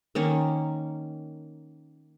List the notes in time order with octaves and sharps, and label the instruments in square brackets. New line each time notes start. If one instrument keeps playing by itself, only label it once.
[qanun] D#3 A#3 C#4